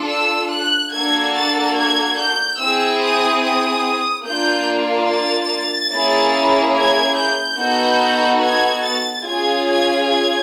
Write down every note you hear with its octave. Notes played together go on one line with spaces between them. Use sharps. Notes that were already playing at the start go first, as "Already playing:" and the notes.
Already playing: D4 F4 A4
E6
F#6
A#3 D4 F#4 A4 G#6
A6
G#6
G6
C4 E4 G#4 E6
D#6
D#6
A#3 D4 F4 G6
A6
A#3 C#4 E4 G#4
G#6
G6
B3 D#4 F#4 A4
G#6
A6
C#4 F4 G#4 G#6
G#6
G#6